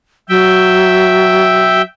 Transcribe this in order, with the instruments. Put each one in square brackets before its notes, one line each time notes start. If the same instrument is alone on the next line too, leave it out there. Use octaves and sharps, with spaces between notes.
[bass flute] F#3 [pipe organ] E5 G5